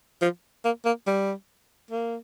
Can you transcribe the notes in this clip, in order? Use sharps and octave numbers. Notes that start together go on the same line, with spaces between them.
F3
A#3
A#3
G3
A#3